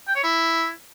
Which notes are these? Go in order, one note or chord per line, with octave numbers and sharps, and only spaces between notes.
G5
C#5
E4